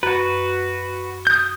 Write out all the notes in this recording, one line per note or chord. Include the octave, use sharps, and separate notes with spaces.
F#2 F#4 B4
D#6 G6